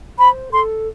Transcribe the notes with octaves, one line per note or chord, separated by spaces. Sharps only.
C5 B5
A4 C6